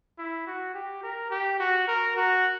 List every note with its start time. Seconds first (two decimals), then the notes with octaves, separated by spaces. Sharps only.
0.19 E4
0.47 F#4
0.74 G4
1.03 A#4
1.31 G4
1.60 F#4
1.88 A#4
2.16 F#4